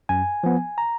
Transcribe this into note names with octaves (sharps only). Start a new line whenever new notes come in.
F#2 G#5
F3 B3
A#5